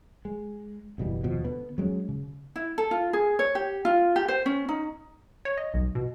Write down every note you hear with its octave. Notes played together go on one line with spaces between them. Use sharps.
G#3
F#1 B2 E3 G3
D#2 B2 F3
D3 B3
F#3 G#3 B3 C#4
C#3
E4
A4
F4
G#4
C#5
G4
F4
G4
C5
C#4
D#4
C#5
D#5
B1
B2